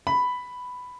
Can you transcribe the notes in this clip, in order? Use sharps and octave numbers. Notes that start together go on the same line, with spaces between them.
B5